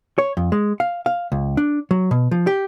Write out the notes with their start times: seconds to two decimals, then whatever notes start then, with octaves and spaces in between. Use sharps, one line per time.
0.18 C#5
0.37 F2
0.52 G#3
0.80 F5
1.06 F5
1.32 C#2
1.57 D4
1.91 F#3
2.11 B2
2.31 F3
2.47 G4